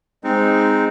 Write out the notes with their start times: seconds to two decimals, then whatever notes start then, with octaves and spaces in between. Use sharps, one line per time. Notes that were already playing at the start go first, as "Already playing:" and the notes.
0.24 G#3 C4 D#4